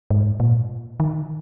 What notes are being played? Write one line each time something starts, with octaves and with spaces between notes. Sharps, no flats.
G#2
A#2
D#3